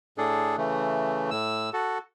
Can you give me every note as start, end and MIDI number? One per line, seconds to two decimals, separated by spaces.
0.18 0.56 45
0.18 0.56 62
0.18 0.56 68
0.18 0.56 69
0.57 1.30 49
0.57 1.30 52
0.57 1.30 57
1.31 1.70 45
1.31 1.70 88
1.73 1.98 66
1.73 1.98 69